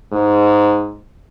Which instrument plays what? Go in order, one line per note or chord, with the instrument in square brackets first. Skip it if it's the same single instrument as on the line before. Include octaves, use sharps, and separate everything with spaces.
[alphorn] G#2